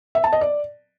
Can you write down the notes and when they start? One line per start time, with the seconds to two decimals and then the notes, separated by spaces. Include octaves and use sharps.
0.15 E5
0.24 A5
0.33 D#5
0.41 D5